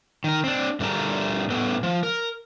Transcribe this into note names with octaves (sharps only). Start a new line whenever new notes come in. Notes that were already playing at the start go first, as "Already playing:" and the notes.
D#3 A#4
C4 D4
G2 D3 A3 A#4 A5 A#5
A2 B3 A4 B4
F3
A#4